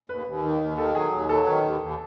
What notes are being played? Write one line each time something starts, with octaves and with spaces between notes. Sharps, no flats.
D#2 B4
D#2
D#3
D#2
D#3 A4
F#3 G#4
D#2
F#3 A4
D#3 B4
D#2
D#2